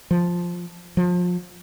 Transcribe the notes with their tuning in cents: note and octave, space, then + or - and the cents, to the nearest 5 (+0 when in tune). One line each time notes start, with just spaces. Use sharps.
F3 +5
F3 +30